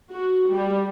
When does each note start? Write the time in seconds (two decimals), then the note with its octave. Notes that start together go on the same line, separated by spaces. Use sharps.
0.11 F#4
0.52 G3